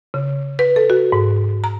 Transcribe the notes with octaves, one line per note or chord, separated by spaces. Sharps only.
C#3
B4
A4
F#4
G#2
A#5